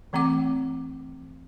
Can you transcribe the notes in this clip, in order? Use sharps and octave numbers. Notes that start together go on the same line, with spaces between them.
E3 A3 C4 F#5 D6